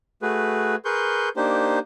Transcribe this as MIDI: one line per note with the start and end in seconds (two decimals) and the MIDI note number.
0.22 0.75 57
0.22 0.75 66
0.22 0.75 68
0.22 0.75 71
0.85 1.29 68
0.85 1.29 70
0.85 1.29 71
0.85 1.29 84
0.85 1.29 85
0.85 1.29 91
1.36 1.79 58
1.36 1.79 62
1.36 1.79 63
1.36 1.79 67
1.36 1.79 72